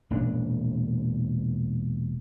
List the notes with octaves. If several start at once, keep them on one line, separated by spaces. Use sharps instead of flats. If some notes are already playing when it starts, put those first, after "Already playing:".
E1 A#2 C#4 D4